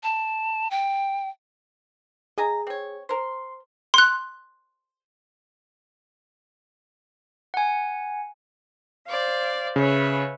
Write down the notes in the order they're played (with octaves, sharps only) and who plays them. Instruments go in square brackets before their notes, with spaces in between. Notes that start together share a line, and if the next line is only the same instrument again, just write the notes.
[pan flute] A5
G5
[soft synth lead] G#4 [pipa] D#5 G#5 A#5
[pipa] C4 C#5
[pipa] A#4 C5 [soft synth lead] C6
[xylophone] C6 F#6
[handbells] F#5 G#5
[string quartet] C5 D5 F5
[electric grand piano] C#3 [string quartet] B4 C#5 E5